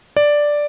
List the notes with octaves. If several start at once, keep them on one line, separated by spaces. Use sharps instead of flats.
D5